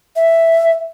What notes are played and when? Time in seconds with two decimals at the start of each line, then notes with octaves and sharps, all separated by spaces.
0.16 E5